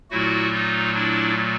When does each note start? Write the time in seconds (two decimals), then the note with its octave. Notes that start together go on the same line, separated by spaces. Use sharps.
0.10 A#2 F#3 A3 E4 F#4
0.52 D#4 F4
0.94 D4 E4